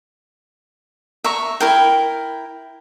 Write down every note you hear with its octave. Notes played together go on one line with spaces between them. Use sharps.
E5 A#5 C#6
E4 A#4 G5